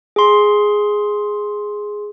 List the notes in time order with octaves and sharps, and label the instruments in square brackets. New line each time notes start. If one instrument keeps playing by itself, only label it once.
[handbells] G#4 C6